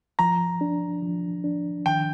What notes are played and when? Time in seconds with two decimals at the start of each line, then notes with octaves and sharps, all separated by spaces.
0.19 F3 A#5
0.61 D4
1.02 F3
1.44 D4
1.86 D#3 G5